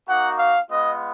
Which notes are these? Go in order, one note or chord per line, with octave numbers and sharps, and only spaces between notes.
A#3 D#4 F#4 F#5
F5
G#3 B3 F4 D#5